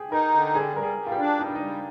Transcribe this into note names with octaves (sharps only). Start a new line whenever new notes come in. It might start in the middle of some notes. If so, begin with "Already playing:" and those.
Already playing: G4 G#4
D#4 A#4
D3
G3 G#4
G3 A#4
G#4
G3
F4
G4
D4
G3 D#4
D4
D#4
G3